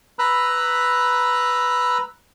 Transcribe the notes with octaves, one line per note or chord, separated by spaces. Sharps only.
B4 A#5 B5 E6 F#6